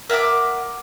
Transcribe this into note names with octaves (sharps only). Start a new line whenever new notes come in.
A#4 E5 F#5 D6